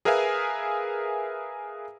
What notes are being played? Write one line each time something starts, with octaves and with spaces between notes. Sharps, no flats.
G#4 A#4 B4 E5 F5 G#5